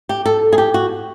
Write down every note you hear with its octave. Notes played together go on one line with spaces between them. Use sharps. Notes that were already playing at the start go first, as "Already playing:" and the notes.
G4
A4
G#4
G4
F#4